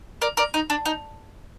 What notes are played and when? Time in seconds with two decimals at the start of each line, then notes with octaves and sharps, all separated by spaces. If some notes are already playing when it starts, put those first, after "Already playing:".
0.22 A#4 D5
0.37 A#4 D5
0.54 D#4
0.70 D4
0.85 D#4